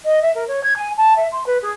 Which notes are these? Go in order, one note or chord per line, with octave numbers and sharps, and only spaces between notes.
D#5
E5
A#4
C#5
G#6
G#5
A5
E5
C6
B4
G#4